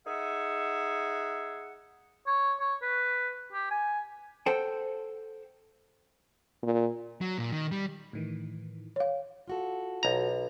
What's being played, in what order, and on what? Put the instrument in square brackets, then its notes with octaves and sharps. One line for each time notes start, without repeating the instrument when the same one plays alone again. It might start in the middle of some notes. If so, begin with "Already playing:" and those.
[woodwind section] D#4 G#4 E5 F#5
[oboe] C#5
C#5
B4
G4
G#5
[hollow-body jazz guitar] A4 C5 F#5 G5
[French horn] A#2
[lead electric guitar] F#3
A#2
D#3
G3
[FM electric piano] A2 D#3 E3
[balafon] C#5 F5
[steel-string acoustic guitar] F4 F#4 A4
[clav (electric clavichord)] B1 A#5